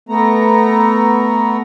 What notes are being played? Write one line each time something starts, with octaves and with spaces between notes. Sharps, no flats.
A3 B3 A#5